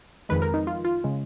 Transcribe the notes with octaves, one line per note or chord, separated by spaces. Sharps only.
F2 D#3 G#3 B4
A#4
D#4
F4
F4
C#3 G#3